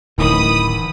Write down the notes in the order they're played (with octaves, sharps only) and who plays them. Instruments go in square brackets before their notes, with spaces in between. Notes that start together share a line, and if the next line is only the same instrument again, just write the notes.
[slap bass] D1 E3 [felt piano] A1 D#3 [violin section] B5 D#6